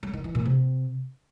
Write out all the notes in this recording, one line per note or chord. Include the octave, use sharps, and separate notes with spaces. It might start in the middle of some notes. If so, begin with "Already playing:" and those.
F#3
D#3
E3
A#2
C3